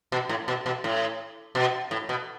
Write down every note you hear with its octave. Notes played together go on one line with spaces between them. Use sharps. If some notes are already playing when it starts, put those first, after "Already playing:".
B2
A2
B2
B2
A2
B2
A2
B2